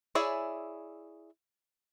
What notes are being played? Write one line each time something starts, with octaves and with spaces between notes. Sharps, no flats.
E4 G#4 C#5 D5 E5